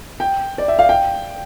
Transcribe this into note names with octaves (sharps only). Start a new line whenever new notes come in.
G5
D5
E5
F5
G5